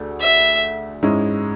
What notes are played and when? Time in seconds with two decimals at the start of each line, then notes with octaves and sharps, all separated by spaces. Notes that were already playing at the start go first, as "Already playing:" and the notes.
Already playing: D2 A3 D4 G#4
0.20 E5
1.03 G#2 G#3 C#4 E4